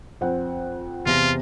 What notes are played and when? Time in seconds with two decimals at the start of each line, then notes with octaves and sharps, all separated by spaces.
0.21 F2 C4 F#5
1.06 E2 C3 F4 A#6